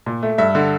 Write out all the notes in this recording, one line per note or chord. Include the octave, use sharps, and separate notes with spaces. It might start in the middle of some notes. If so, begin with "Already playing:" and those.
A#2
A3
G2 E5
D3